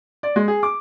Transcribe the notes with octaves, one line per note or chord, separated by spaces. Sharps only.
D5
G#3
G#4
D6